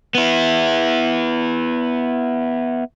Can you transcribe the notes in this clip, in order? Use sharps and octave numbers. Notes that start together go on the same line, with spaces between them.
B3 E4